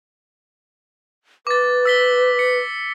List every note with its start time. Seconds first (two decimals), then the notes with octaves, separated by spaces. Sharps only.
1.47 B4 D6 A6
1.85 E6 B6 G7
2.39 C#7